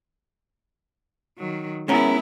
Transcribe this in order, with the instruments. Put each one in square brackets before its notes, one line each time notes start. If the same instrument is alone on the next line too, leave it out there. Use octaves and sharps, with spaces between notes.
[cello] D#3 F#3
[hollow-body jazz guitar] G#3 C#4 A#4 [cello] B3 E4